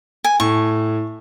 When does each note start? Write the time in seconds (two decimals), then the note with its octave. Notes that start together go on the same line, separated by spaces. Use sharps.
0.24 G#5
0.40 A2 C#6